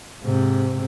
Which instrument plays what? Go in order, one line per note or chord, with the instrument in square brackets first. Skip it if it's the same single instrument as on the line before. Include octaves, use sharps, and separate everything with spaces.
[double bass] G#2 C3